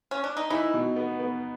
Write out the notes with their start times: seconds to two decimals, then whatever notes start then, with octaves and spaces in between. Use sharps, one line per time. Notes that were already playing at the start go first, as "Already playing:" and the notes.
0.11 C#4
0.24 D4
0.37 D#4
0.50 E3 D#4 E4
0.74 B2
0.96 B3
1.20 B3